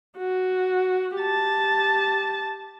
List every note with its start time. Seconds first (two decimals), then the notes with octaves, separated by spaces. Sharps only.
0.17 F#4
1.17 G4 A5